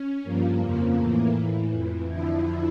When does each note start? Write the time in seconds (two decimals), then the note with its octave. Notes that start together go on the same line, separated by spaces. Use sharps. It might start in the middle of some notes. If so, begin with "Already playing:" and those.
Already playing: C#4
0.24 G2 F3 A#3
0.61 F2 C#3 F3
0.98 A2 E3
1.35 A2 E3
1.71 F2 E3
2.09 F2 D3 F3 E4